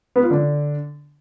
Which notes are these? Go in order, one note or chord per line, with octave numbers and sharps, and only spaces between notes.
B3
F4
D3